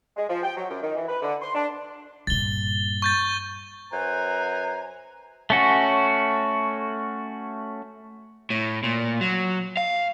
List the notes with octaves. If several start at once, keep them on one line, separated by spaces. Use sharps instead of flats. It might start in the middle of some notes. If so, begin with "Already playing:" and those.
G#3
F3
G5
F#3
F#2
D#3
E3
B4
D3
C6
D4
G2 A#2 A6 G7
C#6 G6 A6
F#2 B4 C5 F#5 G#5 A#5
A3 C#4 F#4
A2
A#2
F#3
F5